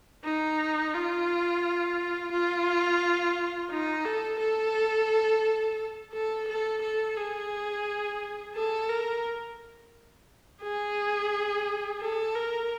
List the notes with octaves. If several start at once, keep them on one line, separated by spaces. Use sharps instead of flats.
D#4
F4
F4
D#4
A4
A4
A4
A4
A4
G#4
A4
A#4
G#4
A4
A#4